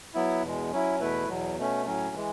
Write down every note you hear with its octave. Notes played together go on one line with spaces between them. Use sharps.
F#3 B3 E4
E2 B2 G#3
F#3 C#4 E4
E2 B2 A3 E4 B4
E2 B2 F#3
B2 A3 C#4
A2 F#3 C#4
E3 G#3